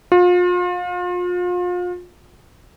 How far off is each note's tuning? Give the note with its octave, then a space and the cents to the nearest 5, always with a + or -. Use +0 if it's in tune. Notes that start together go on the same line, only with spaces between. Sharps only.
F4 +35